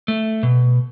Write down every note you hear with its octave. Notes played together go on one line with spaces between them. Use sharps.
A3
B2